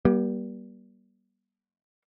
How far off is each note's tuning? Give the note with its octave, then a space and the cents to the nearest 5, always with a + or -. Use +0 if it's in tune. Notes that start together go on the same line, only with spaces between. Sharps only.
G3 -15 A#3 +45